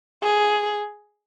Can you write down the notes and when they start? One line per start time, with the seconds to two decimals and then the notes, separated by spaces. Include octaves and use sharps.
0.23 G#4